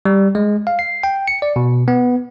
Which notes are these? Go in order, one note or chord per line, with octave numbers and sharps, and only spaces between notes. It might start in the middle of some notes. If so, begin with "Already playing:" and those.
G3
G#3
F5
C7
G5
C#7
D5
B2
B3